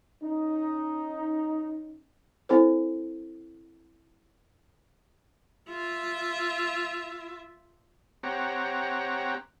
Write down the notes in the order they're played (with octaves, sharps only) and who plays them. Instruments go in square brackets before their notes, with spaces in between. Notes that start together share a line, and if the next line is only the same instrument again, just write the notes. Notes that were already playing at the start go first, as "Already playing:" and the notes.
[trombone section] C#4 D#4
[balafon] C4 E4 A4 C5
[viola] F4 E5
[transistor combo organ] C4 G4 C#5 F#5 A#5